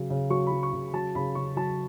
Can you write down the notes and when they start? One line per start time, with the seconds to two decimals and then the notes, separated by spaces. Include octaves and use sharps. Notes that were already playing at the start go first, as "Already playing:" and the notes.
Already playing: C#3 F#3
0.10 C#3
0.30 F#3 C#6
0.47 F#3 B5
0.63 C#6
0.73 C#3
0.93 F#3 A5
1.15 C#3 B5
1.35 C#3 C#6
1.56 F#3 A5